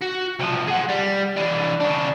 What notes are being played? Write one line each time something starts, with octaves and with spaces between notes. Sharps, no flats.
F#4
C2 F3
G#4 F#5
G3
E3 D4
C#3 D4